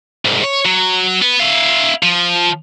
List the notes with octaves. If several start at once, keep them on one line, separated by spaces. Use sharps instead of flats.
C2 G#2
C#5
F#3
B3
E4 F5
F3